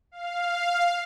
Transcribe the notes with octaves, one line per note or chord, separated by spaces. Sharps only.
F5